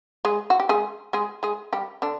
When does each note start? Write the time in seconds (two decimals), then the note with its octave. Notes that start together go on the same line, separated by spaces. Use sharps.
0.25 G#3 G#4
0.50 F#4
0.60 G4
0.69 G#3 G#4
1.13 G#3 G#4
1.43 G#3 G#4
1.73 G3 G4
2.02 D3 D4